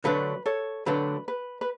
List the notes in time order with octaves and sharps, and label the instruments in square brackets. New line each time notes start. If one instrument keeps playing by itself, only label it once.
[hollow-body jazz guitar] D3 F#3 A3 D4 [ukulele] B4
[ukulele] A4 C#5
[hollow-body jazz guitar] D3 F#3 A3 D4 [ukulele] B4
[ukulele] B4
B4